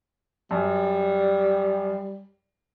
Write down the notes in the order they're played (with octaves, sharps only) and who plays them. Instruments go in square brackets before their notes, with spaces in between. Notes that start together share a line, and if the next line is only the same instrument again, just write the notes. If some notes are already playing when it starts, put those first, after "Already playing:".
[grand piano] F#2 [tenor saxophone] G3